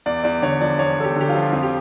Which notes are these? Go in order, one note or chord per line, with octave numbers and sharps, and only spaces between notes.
E2 D5
E2 D5
D3 C#5
F3 D5
E2 C#5
E2 A4
G4
D3
G4
F4
F3
F2 F4
G4